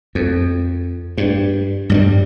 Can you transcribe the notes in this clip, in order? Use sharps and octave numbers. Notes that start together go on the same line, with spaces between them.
F2
G2
G2 F#3 G3